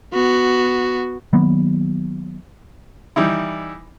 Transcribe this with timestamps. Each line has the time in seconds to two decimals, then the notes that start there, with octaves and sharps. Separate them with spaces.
0.13 B3 F#4
1.33 D#3 F#3 A#3 B3
3.16 E3 G3 D#4 E4